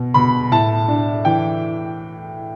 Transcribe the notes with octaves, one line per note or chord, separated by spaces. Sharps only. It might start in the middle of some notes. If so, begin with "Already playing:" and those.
Already playing: B2
B2 B5
A2 A5
D4
E3 G5